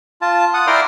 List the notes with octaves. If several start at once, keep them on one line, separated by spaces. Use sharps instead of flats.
F4 A5
F#5 D#6
E4 A#4 D5 G5 C6 F6